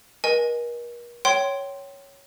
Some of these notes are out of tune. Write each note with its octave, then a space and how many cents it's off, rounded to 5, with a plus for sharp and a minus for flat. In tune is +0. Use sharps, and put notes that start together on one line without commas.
A#4 +40 D#5 -5 G#5 +0
C#5 +0 G5 -20 C6 +0